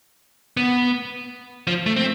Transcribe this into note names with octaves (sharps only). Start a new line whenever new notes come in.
B3
F3
A3
C4